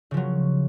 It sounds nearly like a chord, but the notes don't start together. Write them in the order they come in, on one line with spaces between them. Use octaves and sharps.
C#3 F3 F#3